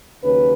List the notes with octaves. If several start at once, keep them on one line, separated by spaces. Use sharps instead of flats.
D#2 C#3 F#3 C#4 B4